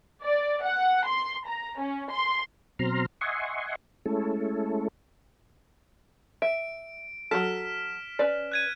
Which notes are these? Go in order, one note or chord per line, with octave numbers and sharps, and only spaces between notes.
D5
F#5
C6
A#5
C#4
C6
B2 F#3 C4 A#5 C6 F6
D#5 E5 F#5 G#5 C6 C#6
G#3 A3 C#4 E4 A4
E5 D7
F#3 F#4 A4 F6 B6 E7
C#4 B4 D5
F#6 G#6 D#7